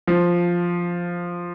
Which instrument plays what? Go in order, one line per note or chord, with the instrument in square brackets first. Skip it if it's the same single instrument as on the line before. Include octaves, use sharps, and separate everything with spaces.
[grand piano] F3